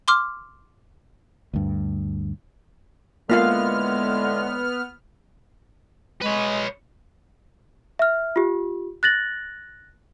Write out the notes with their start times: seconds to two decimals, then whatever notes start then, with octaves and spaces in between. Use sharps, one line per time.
0.08 C6 D6 F6
1.53 D2 G2
3.30 A2 D3 G#3 A#3 B3 F4 F5 F6
6.22 G#3 B4 C#5
7.99 E5 F6
8.36 F4 G4
9.03 F#6 A6 A#6 F#7